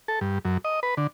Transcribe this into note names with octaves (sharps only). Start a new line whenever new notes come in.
A4
G2
F#2
D#5
B4
D3